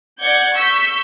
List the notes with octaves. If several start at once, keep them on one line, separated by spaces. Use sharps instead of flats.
D5 F#5 G6 G#6 C#7
C#6 E6 G6 B6